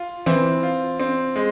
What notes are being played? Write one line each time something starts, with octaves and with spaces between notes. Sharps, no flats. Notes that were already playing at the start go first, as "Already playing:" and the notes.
Already playing: F4
E3 C4
F4
C4
G#3